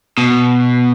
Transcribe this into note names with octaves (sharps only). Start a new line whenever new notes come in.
B2